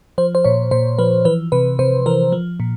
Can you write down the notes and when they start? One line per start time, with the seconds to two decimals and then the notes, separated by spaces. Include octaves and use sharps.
0.18 F3 C5
0.35 C5
0.44 A#2 C#5
0.71 A#2 C5
0.99 F3 B4
1.25 E3 B4
1.52 C3 B4
1.79 C3 C5
2.06 E3 A#4
2.32 F3
2.60 A#2